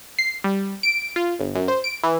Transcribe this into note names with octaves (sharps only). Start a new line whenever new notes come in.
C7
G3
D7
F4
G1
F#2
C5
D7
E3